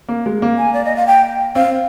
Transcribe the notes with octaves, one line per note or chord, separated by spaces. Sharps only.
A#3
G#3
A#3
G#5
D5
D#5
F5
G5
C4 F5